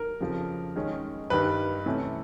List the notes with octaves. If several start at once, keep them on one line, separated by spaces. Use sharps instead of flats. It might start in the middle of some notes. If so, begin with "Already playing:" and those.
Already playing: A#4
F2 C#3 F3
D#3 G#3 C#4
G2 D#3 G3 B4
C3 E3 A3 C#4